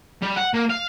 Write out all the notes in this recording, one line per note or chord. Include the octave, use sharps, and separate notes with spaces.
G3
F#5
A#3
F5